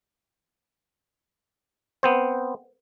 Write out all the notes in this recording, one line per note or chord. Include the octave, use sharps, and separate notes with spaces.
B3 C4 C5